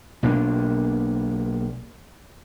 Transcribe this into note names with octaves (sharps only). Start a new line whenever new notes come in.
B1 B2 A#3 D4